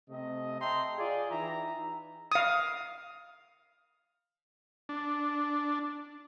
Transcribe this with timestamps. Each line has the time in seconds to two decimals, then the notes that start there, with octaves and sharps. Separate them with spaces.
0.10 C3 A3 D#5
0.61 D#5 E5 G5 A5 A#5 C6
0.97 F4 G#4 D5
1.31 E3 D#4 E5 G5 A#5
2.32 F5 D#6
4.89 D4